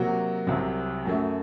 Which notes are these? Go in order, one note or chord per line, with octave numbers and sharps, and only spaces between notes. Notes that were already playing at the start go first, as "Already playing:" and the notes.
Already playing: C3 F#3 A#3 F#4
C2 C3 F#3
F#2 F#3 A3